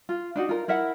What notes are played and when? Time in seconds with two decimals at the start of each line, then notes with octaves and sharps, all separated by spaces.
0.09 F4
0.36 D4 D#4 F#4
0.49 F4 A#4
0.68 E4 A#4 E5 F#5